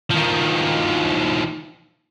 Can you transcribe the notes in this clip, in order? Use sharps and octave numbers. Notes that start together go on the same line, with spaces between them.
D#3 F3